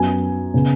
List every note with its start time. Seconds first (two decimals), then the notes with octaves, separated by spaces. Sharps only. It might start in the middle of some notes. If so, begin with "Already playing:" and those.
Already playing: F#2 F#3 B3 G#5
0.54 C#3 B3